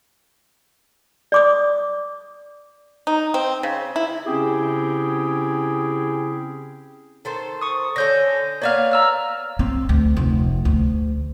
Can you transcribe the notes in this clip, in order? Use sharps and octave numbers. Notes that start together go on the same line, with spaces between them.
D5 D6 D#6
D#4
C4
C#3
E4
C#3 C4 C#4 E4 G4 G#4
D#3 A4 C5
C#6 D#6
D3 C#4 A4 G6 A#6
A#3 B3 C#5 D5 F5 F6
A#5 E6 F6
C4
D2
F1
D2